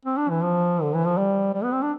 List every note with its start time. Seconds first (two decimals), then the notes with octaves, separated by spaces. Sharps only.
0.05 C4
0.17 D4
0.30 E3
0.43 F3
0.82 D3
0.94 E3
1.06 F3
1.17 G3
1.54 G3
1.64 B3
1.73 C4
1.82 D4